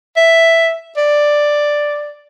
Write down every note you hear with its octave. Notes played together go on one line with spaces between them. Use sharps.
E5
D5